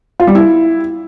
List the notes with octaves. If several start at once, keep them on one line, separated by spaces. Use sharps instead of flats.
F4
G3
E4